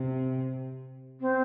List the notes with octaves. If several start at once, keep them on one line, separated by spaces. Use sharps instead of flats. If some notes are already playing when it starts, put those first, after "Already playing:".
Already playing: C3
C4